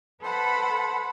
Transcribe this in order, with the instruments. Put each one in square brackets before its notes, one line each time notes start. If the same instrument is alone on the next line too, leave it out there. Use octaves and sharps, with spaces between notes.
[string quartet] A4 B4 C5 F#5 B5